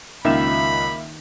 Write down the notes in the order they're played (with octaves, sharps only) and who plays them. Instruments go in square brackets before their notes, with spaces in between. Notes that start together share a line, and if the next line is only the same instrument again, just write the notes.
[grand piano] C#2 F4 [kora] D#3 [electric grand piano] A#3 E5 E7 [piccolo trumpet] B5